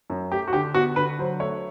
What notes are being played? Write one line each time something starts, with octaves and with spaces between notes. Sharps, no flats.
F#2
A3 G4
F#4
D3 G4
B3 F#4
D3 B4
F#3 C5
A3 C#5